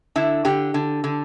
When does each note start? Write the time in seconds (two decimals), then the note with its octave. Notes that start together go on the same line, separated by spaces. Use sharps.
0.16 D3 E4
0.45 D3 G4
0.74 D3
1.04 D3